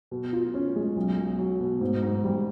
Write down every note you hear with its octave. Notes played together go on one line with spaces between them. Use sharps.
B2
F4
C#4
G#3
B1
B1
F#3
B2
G#2
G#2
G3